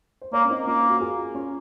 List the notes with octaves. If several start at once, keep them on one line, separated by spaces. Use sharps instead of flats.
C5
A#3 A#4 C#5
C#4
C4 D#4
A#3 C#4 F4
F#4
F4 G#4
C#4 F4